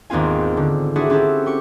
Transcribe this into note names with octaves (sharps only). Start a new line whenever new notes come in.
G#1 D#2 B3 C4 F4 G#5
D3
C4 D4 E4 F#4 G#4
C4 C#4 E4 F#4 G4 A4
G4 C#6